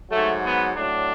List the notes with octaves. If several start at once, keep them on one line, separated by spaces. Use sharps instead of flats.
G#2 F#3 A3
B3
A2 F#3 D4